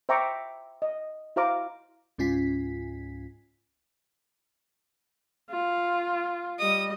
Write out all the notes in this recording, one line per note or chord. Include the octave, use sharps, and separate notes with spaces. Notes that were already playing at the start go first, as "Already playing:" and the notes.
C5 E5 G5 A#5 C#6 D6
D#5
E4 F#4 C5 F5 A#5 D6
C#2 G#2 C#4 F4 G#5 B6
F4
G3 D#5 D#6